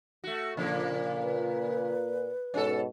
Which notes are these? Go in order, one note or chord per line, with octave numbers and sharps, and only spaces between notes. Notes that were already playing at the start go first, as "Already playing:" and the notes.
A3 F#4
A#2 C#3 F3 A#3
B4
G#2 B2 C#4 A4